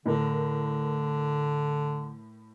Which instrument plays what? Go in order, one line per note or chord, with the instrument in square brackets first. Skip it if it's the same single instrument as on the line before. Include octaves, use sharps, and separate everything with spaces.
[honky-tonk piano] A2 A#4 [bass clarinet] D3